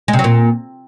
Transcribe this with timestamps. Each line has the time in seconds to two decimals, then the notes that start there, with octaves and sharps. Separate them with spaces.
0.08 G#3
0.13 C3
0.19 F#3
0.24 A#2